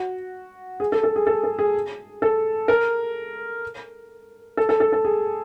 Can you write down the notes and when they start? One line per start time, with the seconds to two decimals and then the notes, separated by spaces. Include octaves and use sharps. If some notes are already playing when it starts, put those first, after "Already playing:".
Already playing: F#4
0.80 G#4
0.92 A4
1.04 A4
1.16 G#4
1.27 A4
1.44 A4
1.59 G#4
2.22 A4
2.68 A#4
4.57 A4
4.69 A4
4.80 A4
4.93 A4
5.05 G#4